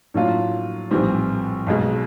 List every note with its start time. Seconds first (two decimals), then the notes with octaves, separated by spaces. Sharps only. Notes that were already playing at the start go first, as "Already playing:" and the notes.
0.14 A2 F#3 A#3 D4 F4
0.91 A#1 A2 E3 G3 C4
1.67 B1 B2 G#3